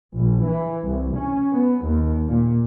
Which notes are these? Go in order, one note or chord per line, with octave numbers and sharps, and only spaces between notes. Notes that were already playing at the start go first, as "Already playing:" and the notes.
A#1
E3
C2
C#4
B3
D#2
A#2